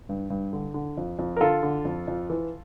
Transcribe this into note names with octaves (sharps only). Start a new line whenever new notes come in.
G2
G2
D3
D3
F2
F2
A#4
D3 F4 A4
D3
F2
F2
E3